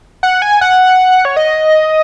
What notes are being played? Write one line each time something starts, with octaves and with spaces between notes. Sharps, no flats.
F#5
G#5
F#5
C#5
D#5